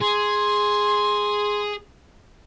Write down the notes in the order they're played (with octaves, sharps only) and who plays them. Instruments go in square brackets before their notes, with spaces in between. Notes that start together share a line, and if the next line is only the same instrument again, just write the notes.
[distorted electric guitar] G#4 [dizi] C6